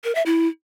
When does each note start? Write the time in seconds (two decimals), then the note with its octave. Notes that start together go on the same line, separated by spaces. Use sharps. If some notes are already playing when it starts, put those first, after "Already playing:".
0.04 A#4
0.15 E5
0.26 E4